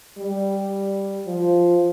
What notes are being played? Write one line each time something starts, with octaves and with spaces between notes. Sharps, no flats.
G3
F3